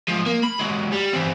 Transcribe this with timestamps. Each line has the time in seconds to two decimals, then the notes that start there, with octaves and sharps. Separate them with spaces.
0.08 G#2 F3
0.26 A#3
0.43 B5
0.59 F#3 G#3
0.92 G3
1.13 E3 C4